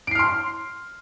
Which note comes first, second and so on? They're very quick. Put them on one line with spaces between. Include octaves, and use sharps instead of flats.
D7 C7 F6 C6